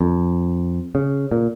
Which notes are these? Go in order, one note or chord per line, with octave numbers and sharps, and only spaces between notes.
F2
C#3
A#2